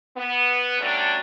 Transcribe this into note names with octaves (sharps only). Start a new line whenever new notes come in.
B3
D3 F#3 G3 A3 C#4 D4